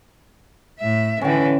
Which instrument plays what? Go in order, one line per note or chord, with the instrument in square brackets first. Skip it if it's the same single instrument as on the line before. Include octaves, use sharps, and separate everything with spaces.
[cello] A2 E5
[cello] D3 E3 [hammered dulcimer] C#4 G5